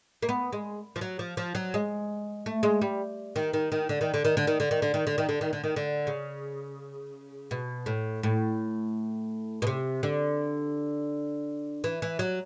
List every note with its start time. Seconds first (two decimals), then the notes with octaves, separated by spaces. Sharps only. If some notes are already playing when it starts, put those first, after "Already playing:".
0.22 A#3
0.29 B3
0.53 G#3
0.96 F3
1.01 F#3
1.19 F3
1.37 F3
1.55 F#3
1.74 G#3
2.46 A3
2.63 G#3
2.82 G3
3.36 D#3
3.53 D#3
3.72 D#3
3.89 D3
4.01 D#3
4.14 D3
4.25 D#3
4.37 D3
4.47 D#3
4.60 D3
4.71 D#3
4.82 D3
4.94 D#3
5.07 D3
5.18 D#3
5.29 D3
5.41 D#3
5.53 D3
5.64 D#3
5.76 D3
6.07 C#3
7.51 B2
7.86 A2
8.23 A2
9.62 B2
9.67 C3
10.03 D3
11.84 E3
12.02 E3
12.19 F#3